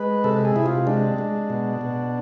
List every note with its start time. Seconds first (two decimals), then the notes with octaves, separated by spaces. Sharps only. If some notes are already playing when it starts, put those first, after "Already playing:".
Already playing: G#3 B4
0.24 C3 A4
0.45 G#4
0.56 C3 E4
0.66 F4
0.87 G#3 D4
1.18 G#3
1.50 B2
1.81 B2